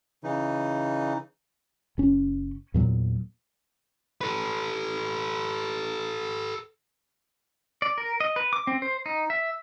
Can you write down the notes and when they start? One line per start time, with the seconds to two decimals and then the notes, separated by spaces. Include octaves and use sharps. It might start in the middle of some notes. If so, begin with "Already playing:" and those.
0.24 C#3 E3 D#4
1.98 F#1 C#4
2.74 E2 A#2 F#3 B3
4.21 A4 B4
7.82 D5
7.98 A#4
8.20 D#5
8.36 B4
8.53 D6
8.67 C4
8.82 C5
9.06 D#4
9.30 E5